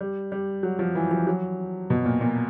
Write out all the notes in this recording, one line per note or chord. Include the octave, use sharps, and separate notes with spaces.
G3
G3
F#3
F3
E3
F3
F#3
B2
A#2
A#2